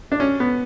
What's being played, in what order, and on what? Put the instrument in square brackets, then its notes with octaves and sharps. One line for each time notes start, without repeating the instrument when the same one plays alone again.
[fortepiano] D4
C#4
B3